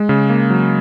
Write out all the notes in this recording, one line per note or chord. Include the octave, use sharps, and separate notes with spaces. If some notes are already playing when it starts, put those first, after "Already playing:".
Already playing: G#3
C#3
A#3
F#3